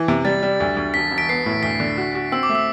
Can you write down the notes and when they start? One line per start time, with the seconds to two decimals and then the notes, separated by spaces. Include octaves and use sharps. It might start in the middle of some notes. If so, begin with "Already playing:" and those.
Already playing: E3
0.08 C3
0.25 G3 A6
0.43 G3
0.60 D2
0.77 D2
0.94 E1 B6
1.11 E1
1.18 B6 D7
1.29 B3 C7
1.46 A2
1.63 D2 B6
1.80 D3
1.97 F#4
2.15 F#4
2.32 C4 E6
2.43 D6
2.49 A3
2.55 E6